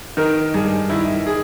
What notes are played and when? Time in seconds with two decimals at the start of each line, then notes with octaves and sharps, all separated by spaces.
0.17 D#3 A#4
0.54 G2 G#4
0.90 D#3 E4
1.27 G#4